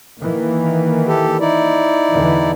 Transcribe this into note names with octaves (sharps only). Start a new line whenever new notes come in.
D#3 E3 A#3
G4 A4
D#4 E4 D5
E2 D3 E3